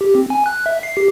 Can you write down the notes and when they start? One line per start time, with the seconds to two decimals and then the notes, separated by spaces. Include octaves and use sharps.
0.01 G4
0.15 C4
0.30 G#5
0.46 F#6
0.66 E5
0.83 C7
0.97 G4